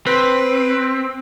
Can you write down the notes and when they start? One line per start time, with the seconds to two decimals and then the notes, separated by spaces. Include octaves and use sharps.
0.06 C4 B4